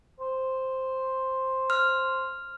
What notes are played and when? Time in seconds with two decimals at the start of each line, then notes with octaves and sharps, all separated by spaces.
0.20 C5
1.70 F6